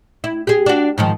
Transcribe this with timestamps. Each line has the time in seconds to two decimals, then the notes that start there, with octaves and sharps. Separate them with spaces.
0.24 E4
0.47 G4 G#4
0.66 D4 F#4
0.98 G#2 D#3 F3